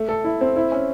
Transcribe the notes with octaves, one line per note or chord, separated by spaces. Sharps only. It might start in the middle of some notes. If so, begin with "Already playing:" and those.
Already playing: A3
A4
E4
C4
E4
C#4